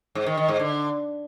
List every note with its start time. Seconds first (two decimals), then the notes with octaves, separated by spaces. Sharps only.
0.15 G#2
0.26 D#3
0.37 D#3
0.48 G#2
0.59 D3